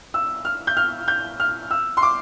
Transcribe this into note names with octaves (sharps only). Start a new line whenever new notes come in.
E6
F6
G6
F6
G6
F6
E6
C6
D6